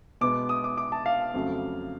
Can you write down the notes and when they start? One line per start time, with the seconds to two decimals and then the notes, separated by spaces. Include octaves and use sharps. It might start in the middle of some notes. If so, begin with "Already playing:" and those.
0.21 B2 G#3 B3 D6
0.49 D#6
0.64 D6
0.78 D6
0.92 A5
1.06 F5
1.34 F2 C#3 F#3 A3